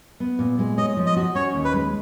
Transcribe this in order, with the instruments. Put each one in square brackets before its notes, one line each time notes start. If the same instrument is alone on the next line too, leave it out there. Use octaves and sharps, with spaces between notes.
[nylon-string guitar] B3
A#2
G#3
[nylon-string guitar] C#5 [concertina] D#5
[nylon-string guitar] F3
[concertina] D#5
[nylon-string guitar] F#4
[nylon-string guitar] C#4 [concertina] C#5
[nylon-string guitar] D#2
[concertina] B4
[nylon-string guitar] G#3